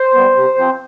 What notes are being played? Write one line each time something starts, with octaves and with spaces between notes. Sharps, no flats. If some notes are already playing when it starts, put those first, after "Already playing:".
Already playing: C5
G3 B3
C3
F3 C4